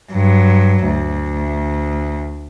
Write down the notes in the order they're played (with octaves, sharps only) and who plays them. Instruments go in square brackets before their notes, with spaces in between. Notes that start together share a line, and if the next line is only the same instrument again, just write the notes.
[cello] G2 F#3
D2